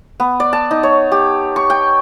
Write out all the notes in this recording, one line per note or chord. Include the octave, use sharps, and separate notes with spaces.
B3
D5
A5
D#4
C#5
G4
C#6
G5